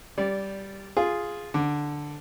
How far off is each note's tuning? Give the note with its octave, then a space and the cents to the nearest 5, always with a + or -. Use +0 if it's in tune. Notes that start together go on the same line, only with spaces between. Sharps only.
G3 +0 D5 -15
F4 +0 G#4 +0
D3 +0 D6 +0